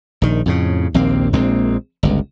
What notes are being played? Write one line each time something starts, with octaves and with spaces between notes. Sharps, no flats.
A#1 D#3
F2 A2 C#3
A#1 D#2 A#3 C4
A#1 A#2 G#3 C4
G1 C#2